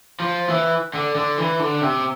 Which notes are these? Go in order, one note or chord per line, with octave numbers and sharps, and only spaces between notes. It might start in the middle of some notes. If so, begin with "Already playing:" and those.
F3
E3
D3
D3
E3
D3
C3